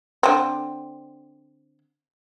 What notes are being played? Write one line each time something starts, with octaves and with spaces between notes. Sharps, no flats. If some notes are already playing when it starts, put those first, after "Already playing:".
D3 C4